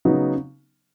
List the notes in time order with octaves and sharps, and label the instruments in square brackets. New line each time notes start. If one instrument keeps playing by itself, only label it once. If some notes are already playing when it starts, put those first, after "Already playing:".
[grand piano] C#3 F#3 B3 D#4